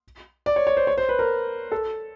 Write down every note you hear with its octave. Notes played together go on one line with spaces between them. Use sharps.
D5
C#5
C#5
C5
C#5
C5
B4
A#4
A4